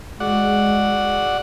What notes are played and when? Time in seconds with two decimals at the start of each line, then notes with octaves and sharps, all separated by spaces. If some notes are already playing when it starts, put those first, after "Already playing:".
0.20 G#3 F#4 D5 F#5